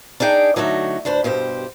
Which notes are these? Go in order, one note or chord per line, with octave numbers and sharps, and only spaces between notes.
D4 D#4 G#4 G5 G#5
D3 F#3 A3 D#4 F#4
D2 D4 B4 C5
G2 B2 G4 C5